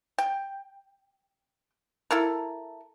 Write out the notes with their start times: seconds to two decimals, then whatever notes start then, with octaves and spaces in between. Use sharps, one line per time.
0.18 G5
2.11 E4 A4 A#4